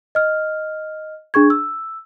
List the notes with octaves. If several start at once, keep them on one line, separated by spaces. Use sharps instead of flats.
D#5 F6
D4 G#4 C#6 G#6
E6